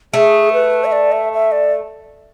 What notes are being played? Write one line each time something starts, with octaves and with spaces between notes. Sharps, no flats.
A3 G#4
B4
E5
D5
E5
E5
D5